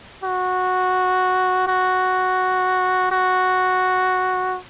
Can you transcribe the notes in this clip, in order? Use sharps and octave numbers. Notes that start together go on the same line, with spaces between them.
F#4
F#4
F#4